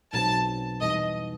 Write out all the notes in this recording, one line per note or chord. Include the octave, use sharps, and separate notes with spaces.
B1 B2 F#3 C4 A5
E2 B2 G3 D#4 D#5